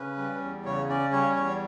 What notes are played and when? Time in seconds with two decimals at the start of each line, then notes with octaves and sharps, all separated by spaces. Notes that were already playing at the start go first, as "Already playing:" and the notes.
Already playing: C#3 C#4 B4
0.17 G3
0.41 E2
0.65 C#3 C#5
0.89 C#4 D5
1.12 G3 C#5
1.36 E2 C#5